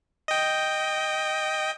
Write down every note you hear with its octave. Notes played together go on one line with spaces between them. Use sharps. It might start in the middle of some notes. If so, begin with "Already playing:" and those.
D#5 G5